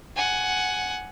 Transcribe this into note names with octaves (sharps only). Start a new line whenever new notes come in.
F#5 G#5